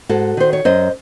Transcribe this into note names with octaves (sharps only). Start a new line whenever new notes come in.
G#2 F#4 A4
D#3 C5
C#5
F#2 C5 D#5